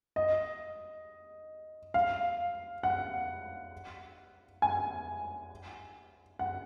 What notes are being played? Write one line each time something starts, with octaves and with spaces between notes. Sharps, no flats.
D#5
F5
F#5
G#5
F#5